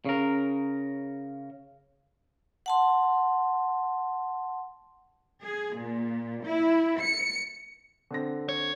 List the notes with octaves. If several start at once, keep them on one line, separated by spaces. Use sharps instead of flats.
C#3 A#4
F#5 A5 C6
G#4
A#2
E4
C#7
D3 C4 A#6
C#5